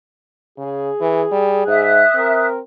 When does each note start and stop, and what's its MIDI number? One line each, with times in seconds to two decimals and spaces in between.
0.58 0.90 49
0.58 2.04 68
1.01 1.24 52
1.32 1.63 55
1.67 2.03 44
1.67 2.46 76
1.67 2.46 87
1.67 2.46 90
2.15 2.61 60
2.15 2.59 70